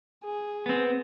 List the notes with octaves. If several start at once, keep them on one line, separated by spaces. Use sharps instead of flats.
G#4
B3 C4